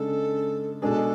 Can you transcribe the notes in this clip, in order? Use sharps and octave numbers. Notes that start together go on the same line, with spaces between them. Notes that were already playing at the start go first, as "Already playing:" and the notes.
Already playing: C#3 G#3 D4 A4
B2 G#3 D4 G#4 A4 B4